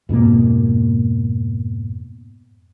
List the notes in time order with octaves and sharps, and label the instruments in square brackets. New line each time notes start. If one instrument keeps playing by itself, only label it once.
[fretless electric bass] F2 G#2 B2 A#3